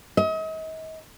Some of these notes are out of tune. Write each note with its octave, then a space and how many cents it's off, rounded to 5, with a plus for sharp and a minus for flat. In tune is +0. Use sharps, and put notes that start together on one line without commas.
D#5 +40